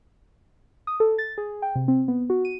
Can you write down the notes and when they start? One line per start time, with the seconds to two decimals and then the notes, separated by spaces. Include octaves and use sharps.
0.87 D#6
1.00 A4
1.18 A6
1.38 G#4
1.62 G5
1.75 C3
1.88 C4
2.08 B3
2.30 F#4
2.45 D#7